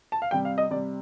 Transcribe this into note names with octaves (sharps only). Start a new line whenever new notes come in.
A5
F5
C3 G3 G5
F5
D#5
C3 G3 D5